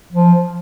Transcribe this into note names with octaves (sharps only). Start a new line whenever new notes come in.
F3